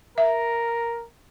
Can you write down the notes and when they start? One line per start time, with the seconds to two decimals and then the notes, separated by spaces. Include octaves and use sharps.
0.18 A#4 E5